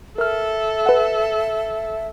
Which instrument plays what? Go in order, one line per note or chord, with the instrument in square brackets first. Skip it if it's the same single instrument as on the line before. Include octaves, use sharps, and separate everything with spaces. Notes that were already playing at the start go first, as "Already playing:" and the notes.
[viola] A4 [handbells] A#4 F6 [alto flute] E5
[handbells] B4 F#5